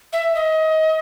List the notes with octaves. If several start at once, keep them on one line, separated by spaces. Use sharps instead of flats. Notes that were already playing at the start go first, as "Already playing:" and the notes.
E5
D#5